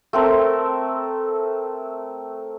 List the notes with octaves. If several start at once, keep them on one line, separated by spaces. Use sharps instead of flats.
A3 C4 A#4